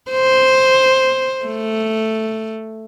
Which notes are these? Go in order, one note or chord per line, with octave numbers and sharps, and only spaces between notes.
C5
A3